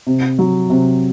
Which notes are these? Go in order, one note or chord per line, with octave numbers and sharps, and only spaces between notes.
C3
F#3
C3